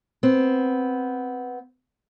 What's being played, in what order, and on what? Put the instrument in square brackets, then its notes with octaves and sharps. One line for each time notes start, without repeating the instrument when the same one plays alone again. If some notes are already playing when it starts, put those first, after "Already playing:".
[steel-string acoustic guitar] B3 C4